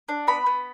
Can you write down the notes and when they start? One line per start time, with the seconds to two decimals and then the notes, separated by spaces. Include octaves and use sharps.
0.09 D4
0.27 B3 B5
0.46 B3